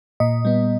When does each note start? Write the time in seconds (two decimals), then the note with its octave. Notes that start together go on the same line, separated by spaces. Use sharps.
0.20 A#2 D#5
0.45 G3 B3